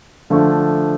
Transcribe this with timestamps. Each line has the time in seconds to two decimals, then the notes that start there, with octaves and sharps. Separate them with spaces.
0.30 D3 F3 A3 D4